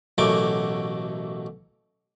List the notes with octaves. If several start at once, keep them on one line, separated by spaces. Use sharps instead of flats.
A1 B2 F#3 A3 A#3 D6